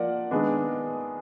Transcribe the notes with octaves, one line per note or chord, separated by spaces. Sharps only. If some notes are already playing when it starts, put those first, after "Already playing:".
Already playing: F3 A#3 D5 F#5
D#3 G#3 B3 D4